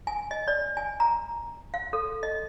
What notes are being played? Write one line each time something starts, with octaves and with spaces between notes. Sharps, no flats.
G#5
D#5
D5
G#5
A#5
F5
A4
D#5